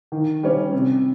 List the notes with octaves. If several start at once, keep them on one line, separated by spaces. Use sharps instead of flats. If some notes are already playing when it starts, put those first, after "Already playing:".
D#3
G3 C#4
C3